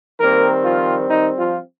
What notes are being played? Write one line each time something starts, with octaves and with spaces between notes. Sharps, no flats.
D#3 G3 A#3 C4 A#4
F3 F4
D#3 D#4
F3 F4